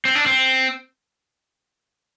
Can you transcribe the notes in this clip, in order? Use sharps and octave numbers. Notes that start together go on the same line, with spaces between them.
C4
D4
C4